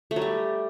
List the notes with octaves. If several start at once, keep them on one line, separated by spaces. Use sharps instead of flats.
A3
F#3
G3